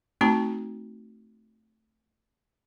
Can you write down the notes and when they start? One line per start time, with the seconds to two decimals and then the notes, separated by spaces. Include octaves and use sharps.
0.21 A3 C4 D#4 F#4 A5